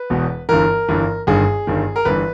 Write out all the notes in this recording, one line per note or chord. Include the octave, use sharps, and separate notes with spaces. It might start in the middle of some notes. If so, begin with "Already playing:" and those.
Already playing: B4
E1 E2 B2
G1 G2 E3 A#4
G1 G2 E3
G1 G2 D#3 G#4
G1 G2 D#3
A#4
G1 G2 E3 B4